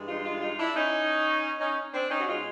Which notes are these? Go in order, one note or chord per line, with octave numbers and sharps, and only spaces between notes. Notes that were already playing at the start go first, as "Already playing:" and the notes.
Already playing: G2 E3 G#3
D#4 F4
D#4 F4
D#4 F4
D4 E4
C#4 D#4
C#4 D#4
C4 D4
C#4 D#4
F#4
B2 G#3 D#4 F4